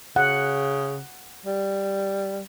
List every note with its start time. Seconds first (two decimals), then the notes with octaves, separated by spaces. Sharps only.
0.16 C#3 F#5
1.46 G3